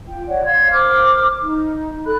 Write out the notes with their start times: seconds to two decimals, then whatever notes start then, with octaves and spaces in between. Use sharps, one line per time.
0.07 F4 G5
0.27 C#5 D5 F#5
0.44 F5 C6 G#6
0.70 A#4 C5 D6 F6
1.41 D#4
2.05 A4 B5 F#6